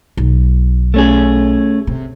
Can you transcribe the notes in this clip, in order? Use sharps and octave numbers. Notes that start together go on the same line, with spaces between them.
B1
A3 C#4 G#4
C3